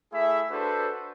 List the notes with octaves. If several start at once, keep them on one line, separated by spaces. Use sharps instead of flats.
A3 E4 G#4 E5
D4 F#4 A4 B4 C5